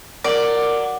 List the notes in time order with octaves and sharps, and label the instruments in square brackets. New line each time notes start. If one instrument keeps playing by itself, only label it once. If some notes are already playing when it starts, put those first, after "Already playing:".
[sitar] F#3 [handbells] A#4 [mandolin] D5 [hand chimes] D6